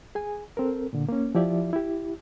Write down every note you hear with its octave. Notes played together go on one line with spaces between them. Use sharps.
G#4 G#5
C4 A4 A#4
A#2 D3
A#3 C#4
F3 E4 G4 D5 E5
E4 G4